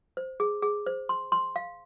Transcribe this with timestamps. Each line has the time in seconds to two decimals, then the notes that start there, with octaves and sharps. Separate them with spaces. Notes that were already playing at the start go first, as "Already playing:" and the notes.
0.17 C5
0.40 G#4
0.62 G#4
0.86 C5
1.09 C6
1.32 C6
1.56 F5